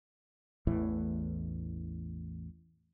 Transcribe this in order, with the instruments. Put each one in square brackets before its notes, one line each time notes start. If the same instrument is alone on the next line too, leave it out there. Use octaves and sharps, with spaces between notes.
[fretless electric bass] A1 E2 A2 E3